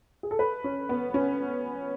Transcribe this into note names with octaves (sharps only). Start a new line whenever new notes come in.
G#4
A4
B4
C#4
B3
C#4